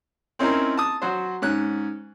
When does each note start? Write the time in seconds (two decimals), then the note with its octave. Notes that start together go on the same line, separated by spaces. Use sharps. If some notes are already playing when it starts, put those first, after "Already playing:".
0.39 C4 C#4 D#4 E4 A#4 C5
0.77 A5 D#6
1.02 F#3 F#4 C5
1.42 G#2 C#4 F#6